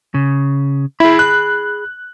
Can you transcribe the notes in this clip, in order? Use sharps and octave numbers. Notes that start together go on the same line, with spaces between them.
C#3
E4 G#4 B5
F#6